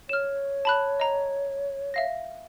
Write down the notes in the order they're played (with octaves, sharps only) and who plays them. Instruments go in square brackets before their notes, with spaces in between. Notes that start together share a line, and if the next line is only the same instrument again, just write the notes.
[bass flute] C#5 [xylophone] F6 E7
[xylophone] A5 B5 F#6
D#5 A#5
E5 F5 A#6